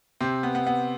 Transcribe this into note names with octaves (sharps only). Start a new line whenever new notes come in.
C3 C4
B3
B3
B3